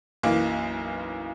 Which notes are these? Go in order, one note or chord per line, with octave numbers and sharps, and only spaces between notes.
B1 F#2 E3 A#3